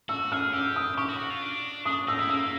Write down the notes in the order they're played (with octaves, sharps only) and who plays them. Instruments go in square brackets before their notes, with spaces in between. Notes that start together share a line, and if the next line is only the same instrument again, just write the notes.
[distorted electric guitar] F#4 [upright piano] E6
[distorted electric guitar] G#4 [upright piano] F6
[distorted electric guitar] G4 [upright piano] E6
[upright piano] D#6
[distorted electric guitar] G4 [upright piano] C#6
[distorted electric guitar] F#4
F#4
F4
D4
[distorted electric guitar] D4 [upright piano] D#6
[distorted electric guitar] D#4 [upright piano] E6
[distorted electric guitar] E4
[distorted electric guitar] A#3 [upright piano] E6